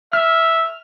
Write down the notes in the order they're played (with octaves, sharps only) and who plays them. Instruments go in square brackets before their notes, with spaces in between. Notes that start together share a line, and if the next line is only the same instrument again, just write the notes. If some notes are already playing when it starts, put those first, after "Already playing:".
[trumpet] E5 [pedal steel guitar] F6